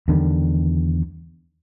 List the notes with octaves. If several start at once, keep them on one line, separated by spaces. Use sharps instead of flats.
E2 D3 D#3 G3